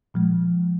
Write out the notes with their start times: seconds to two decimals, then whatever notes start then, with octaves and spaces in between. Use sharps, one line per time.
0.14 A#2 F3 G#3